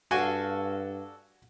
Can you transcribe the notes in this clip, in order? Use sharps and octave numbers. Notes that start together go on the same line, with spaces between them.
G2 D4 F#4 A4 F5 G#5